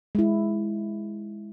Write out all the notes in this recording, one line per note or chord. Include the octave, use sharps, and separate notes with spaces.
G#3 E4